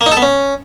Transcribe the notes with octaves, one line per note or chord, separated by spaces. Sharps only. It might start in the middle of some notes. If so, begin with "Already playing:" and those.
A#3
D#4
A4
B3
C#4